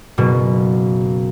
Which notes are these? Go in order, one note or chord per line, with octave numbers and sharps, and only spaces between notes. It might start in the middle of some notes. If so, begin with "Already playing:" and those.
F#1 B2